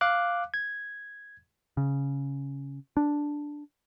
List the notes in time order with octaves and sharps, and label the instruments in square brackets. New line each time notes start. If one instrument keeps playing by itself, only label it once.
[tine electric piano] F5 D6 F#6
G#6
[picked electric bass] C#3
D4